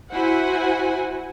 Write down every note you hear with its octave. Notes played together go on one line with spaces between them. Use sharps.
E4 F#4 C5 F#5 G#5